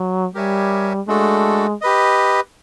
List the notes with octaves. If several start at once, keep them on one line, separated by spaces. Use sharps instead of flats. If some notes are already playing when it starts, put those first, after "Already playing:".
Already playing: F#3
G3 G4 A#4 C#5 E5 G#5
G#3 A3 D4 F#4 A4
G4 B4 D#5